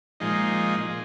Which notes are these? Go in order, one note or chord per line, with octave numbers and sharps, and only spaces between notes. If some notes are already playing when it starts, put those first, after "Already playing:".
A#2 F3 G#3 D#4
A#2